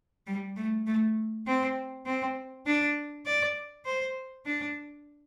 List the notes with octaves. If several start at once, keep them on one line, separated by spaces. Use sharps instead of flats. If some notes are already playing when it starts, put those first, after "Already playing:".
G3
A3
A3
C4
C4
D4
D5
C5
D4